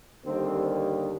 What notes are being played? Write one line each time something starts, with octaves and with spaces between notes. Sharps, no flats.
D#2 D3 G3 C4